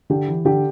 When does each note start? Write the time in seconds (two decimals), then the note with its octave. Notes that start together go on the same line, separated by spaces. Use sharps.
0.10 D3 G4
0.28 E3
0.45 D3 G4